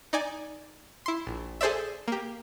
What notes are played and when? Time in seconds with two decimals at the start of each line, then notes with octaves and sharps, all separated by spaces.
0.13 D#4 D5 G#5
1.06 E4 C6
1.27 A#1
1.61 G#4 A4 C5 D5 E5
2.08 A#3 G4